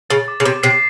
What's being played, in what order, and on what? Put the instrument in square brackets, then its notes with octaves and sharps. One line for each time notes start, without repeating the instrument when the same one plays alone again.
[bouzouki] C#3 [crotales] A6
[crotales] D6
[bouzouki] C#3
[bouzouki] C3 [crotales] D6
[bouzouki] C3 [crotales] C7